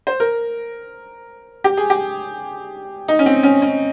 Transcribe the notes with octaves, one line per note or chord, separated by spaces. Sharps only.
C5
A#4
G4
G#4
G4
D#4
C#4
C4
C#4
C#4